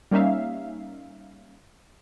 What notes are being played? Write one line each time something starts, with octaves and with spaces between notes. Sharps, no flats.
G3 A#3 C#4 D#4 E5 F5